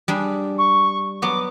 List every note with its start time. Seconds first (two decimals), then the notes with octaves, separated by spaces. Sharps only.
0.08 G3 D4 G#4
0.58 C#6
1.22 F#3 B3 D6